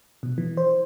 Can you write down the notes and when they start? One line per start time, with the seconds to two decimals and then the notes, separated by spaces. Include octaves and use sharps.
0.23 B2
0.38 E3
0.57 C5